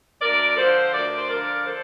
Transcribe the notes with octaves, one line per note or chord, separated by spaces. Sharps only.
D2 A#4 D5
D3 F3 A4 C5
D2 A#4 D5
C5
D3 F3 A#4 D5
A4 C5